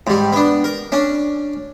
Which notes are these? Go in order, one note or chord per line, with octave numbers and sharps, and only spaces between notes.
G#2 G3
B3 D4
A#4
C#4 D4